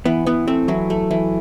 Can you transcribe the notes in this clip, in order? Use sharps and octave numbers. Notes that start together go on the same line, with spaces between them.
E3 B3
E3 B3
A3 C4
E3 F#3
A3
E3